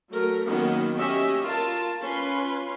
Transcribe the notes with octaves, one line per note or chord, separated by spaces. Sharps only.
F#3 A3 A#4
D#3 F#3 A#3 B3 C#4
C#4 G4 D#5 E5
F4 A#4 A5
C#4 F4 B4 C6